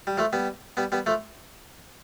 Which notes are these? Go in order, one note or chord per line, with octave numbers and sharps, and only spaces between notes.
G3
F3 A3
G3 B3
G3 B3
G3 B3
F3 A3